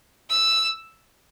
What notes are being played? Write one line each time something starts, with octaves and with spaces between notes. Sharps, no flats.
E6